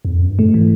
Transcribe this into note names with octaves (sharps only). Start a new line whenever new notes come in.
E2
F2
F#2
G2
G#2 A3
E3